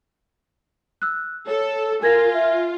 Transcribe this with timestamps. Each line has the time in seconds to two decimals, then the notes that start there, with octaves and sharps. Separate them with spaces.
1.02 E6 F#6
1.47 A4 C#5
2.02 F4 A#4 G#5 G#6 A#6
2.33 E5